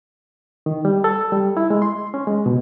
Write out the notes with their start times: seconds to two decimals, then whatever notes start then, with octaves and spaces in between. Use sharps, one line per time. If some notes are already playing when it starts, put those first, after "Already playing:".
0.66 D#3
0.85 G3
1.04 A4
1.32 G3
1.57 E4
1.70 G#3
1.82 C6
2.14 C#4
2.27 G#3
2.46 B2